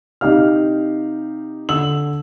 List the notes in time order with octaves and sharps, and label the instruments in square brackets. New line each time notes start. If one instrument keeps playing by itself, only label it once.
[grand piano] C3 D#4 G4 F5 F6
D3 E6 F#7